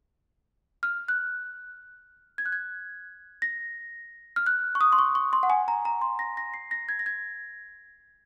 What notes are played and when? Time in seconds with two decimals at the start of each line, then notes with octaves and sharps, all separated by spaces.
0.83 F6
1.08 F#6
2.38 G#6
2.46 F#6
2.52 G#6
3.42 A#6
4.36 F6
4.46 F#6
4.75 C#6
4.81 D#6
4.92 C6
4.99 C#6
5.15 C#6
5.33 C6
5.43 F#5
5.50 G#5
5.68 A#5
5.85 A#5
6.01 C6
6.19 A#6
6.37 A#6
6.54 C7
6.71 A#6
6.89 G#6
6.99 A#6
7.06 G#6